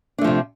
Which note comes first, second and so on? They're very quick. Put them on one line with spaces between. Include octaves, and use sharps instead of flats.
D4 A3 F3 C3